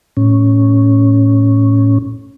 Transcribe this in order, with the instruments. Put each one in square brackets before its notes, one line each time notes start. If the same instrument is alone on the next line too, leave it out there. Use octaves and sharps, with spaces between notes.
[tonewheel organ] A2 C#4